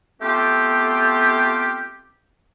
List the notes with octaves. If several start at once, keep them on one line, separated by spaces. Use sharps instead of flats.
A3 B3 C4 F4 G4